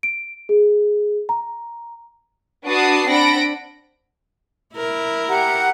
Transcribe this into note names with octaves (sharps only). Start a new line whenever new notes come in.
D7
G#4
A#5
D4 F#4 B4 A5 D#6 C7
C4 D4 F#5 B5 A#6 D7
E4 A#4
G4 F#5 A#5